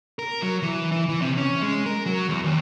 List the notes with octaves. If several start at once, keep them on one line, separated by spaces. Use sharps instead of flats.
A#4
F#3
E3
E3
E3
C3
C#4
G#3
A#4
F#3
E2
D#2